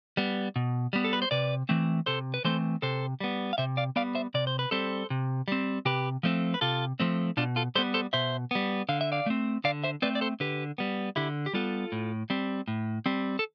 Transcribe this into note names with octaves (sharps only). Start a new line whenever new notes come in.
G3 B3
B2
G3 B3
A4
B4
C5
C3 B4 D5
E3 A3 C4
C3 A4 C5
B4
E3 A3 C4 A4 C5
C3 A4 C5
G3 B3
F5
C3 C5 E5
D5 F5
G3 B3 D5 F5
C5 E5
C3 D5
C5
B4
G3 C4 A4 C5
C3
G3 C4
C3 G4 B4
F3 A3 C4
B4
C3 F4 A4
F3 A3 C4
B2 D4 F4
F4 A4
G3 B3 A4 C5
A4 C5
B2 C5 E5
G3 B3
D3 F5
E5
D5 F5
A3 C4
D3 D5 F5
C5 E5
A3 C4 B4 D5
D5
A4 C5
D3 G4 B4
G3 B3
D3 E4 G4
G4
G3 B3 F4 A4
A2
G3 C4
A2
G3 C4
A4